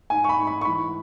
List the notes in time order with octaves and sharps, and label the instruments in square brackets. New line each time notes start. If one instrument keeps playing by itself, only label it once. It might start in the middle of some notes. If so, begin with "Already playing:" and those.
[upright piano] G#2 G#5
C#6
B5
G#2
B5
C#6
E3 B5